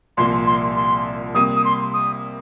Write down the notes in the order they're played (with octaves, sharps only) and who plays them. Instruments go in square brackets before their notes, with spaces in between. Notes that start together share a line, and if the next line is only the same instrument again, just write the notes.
[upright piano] C2 A#2 F3 A#3 [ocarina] C6
[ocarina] C6
C6
[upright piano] C3 G3 A#3 [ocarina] D#6
[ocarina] D#6
C6
D#6